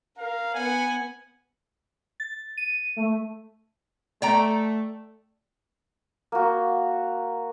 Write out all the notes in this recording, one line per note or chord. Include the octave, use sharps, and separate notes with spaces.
A#4 F5
B3 F#5 G#5
A6
D#7
A3
A3 D5 G5 A#5
A#3 F#4